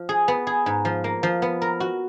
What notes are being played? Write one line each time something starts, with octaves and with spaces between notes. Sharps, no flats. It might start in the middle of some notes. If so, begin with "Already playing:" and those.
Already playing: F3 F4
G#4
B3
G#4
G#2
F3
A#3
F3
B3
A#4
F#4